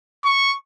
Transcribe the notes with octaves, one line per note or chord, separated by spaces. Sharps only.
C#6